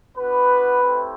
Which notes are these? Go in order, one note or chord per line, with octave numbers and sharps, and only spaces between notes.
B3 D4 F#4 B4
A3 C4 E4 G4